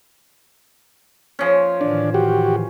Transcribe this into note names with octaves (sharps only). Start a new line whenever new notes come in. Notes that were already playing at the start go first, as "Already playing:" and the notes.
F3 C#4
A2 D#3 E3 D4
F#4 G4